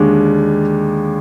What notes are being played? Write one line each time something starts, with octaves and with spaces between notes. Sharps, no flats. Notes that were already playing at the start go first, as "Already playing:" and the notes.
Already playing: D#2 D3 G#3 D4